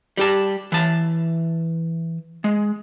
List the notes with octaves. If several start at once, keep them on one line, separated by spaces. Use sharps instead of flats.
G3 G4 A5
E3 A5
G#3